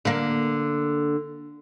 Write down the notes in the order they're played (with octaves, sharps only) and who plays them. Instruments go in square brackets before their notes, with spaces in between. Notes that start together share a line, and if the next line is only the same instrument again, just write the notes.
[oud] D3 A#3